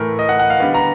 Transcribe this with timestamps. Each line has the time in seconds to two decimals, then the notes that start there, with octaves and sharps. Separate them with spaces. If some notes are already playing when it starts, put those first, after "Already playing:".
Already playing: A2 E3 A3 A#4
0.19 D#5
0.29 F#5
0.39 F#5
0.50 F5
0.60 D3 G3 B3
0.74 A#5